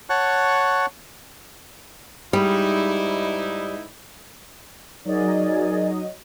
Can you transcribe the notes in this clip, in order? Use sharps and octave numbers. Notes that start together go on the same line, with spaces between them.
C#5 F#5 A5 C#6 F#6
G#2 G3 D#4 E4
F#3 D#4 G#4 A#4 D5 D#5